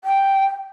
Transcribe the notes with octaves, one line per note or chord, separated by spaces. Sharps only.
G5